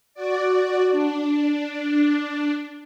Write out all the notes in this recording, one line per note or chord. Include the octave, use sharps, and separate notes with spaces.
F#4 D5
D4